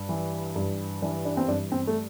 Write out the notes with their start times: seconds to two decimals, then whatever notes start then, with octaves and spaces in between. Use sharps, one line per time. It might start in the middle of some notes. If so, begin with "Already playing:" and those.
Already playing: G2
0.09 E3
0.56 G2
1.02 E3 D4
1.25 D4
1.37 C4
1.48 G2 D4
1.72 C4
1.87 A3